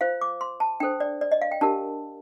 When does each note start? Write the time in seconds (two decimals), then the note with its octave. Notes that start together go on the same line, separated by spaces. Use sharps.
0.01 F4 C5 F5
0.21 D6
0.41 C6
0.60 A5
0.80 D4 A4 C5 G5
1.00 D5
1.21 D5
1.31 D#5
1.41 F5
1.51 G5
1.61 D4 G4 A#4 A5